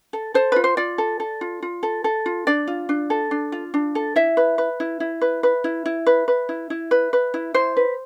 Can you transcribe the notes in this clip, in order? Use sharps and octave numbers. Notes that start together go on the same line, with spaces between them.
A4
A4 C5
F4 B4
C5
F4 D5
A4
A4
F4
F4
A4
A4
F4
D4 D5
F4
D4
A4
D4
F4
D4
A4
E4 E5
B4
B4
E4
E4
B4
B4
E4
E4
B4
B4
E4
E4
B4
B4
E4
E4 C5
B4